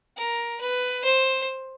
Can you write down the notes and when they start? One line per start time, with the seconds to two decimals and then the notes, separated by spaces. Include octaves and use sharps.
0.17 A#4
0.61 B4
1.04 C5